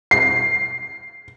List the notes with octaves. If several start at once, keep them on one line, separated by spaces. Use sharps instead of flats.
C7